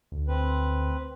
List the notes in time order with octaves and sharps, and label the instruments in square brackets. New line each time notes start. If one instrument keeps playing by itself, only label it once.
[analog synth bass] D2
[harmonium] C4 B4